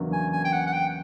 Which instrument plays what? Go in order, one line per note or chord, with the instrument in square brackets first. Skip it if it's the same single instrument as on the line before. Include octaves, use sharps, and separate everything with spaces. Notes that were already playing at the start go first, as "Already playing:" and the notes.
Already playing: [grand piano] E2 C#3 F#3 A#3 D4
[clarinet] G#5
G#5
G5
F#5
F#5
G5